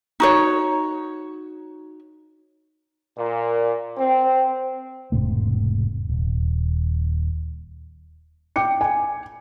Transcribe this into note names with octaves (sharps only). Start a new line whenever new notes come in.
D#4 F#4 C#5
A#2
C4
E1 G#2 C3 A3
D#1
G5 D6 C#7
G#5